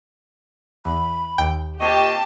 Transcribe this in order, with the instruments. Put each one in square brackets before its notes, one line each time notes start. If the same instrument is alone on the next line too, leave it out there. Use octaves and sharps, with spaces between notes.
[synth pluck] E2 [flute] B5
[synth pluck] D#2 G5
[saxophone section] A#2 C4 D#5 [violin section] G4 A5 [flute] C#6